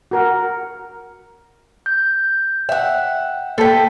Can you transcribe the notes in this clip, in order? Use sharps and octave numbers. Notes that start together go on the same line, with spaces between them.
F#4 A#4 F#5
G6
E5 F#5 G5
A#3 A4 G5 A5 B6